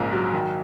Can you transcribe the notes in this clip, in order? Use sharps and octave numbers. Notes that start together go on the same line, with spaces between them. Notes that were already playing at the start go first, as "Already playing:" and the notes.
Already playing: A#1 G#2 C#3 A#3 A#4
F#3
D#3